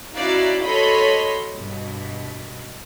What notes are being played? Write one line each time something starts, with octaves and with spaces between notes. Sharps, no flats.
C#4 D#4 E4 F#4 D5 F5
F#4 A4 C#5 D#5 B5 C6
G2 B2